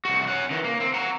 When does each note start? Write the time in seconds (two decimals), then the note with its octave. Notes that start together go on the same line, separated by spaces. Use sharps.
0.05 C2 F#4
0.28 C#4 F#5
0.51 D#3 E3
0.64 A#3
0.80 C4
0.94 F#5 A#5